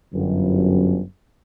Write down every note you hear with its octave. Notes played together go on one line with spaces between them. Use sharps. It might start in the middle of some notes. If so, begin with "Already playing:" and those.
G1 F#2